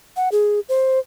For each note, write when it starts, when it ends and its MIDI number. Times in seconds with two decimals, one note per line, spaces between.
0.16 0.29 78
0.32 0.60 68
0.69 0.99 72